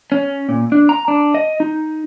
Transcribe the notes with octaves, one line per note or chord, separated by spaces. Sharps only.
C#4
A#2
D4
A#5
D4
D#5
D#4